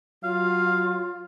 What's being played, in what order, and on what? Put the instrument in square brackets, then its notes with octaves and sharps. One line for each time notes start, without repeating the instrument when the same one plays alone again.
[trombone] F#3 [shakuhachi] F4 [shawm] F5